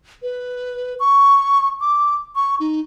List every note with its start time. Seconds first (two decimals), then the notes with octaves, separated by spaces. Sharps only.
0.23 B4
1.00 C#6
1.81 D6
2.36 C#6
2.60 D#4